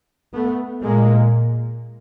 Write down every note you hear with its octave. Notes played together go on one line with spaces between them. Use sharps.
A3 B3
A#2 G#3 A#3